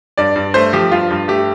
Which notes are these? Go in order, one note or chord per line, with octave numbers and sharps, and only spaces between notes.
G2 D5
G2
A3 C5
F3 G4
G2 F4
G2
A3 G4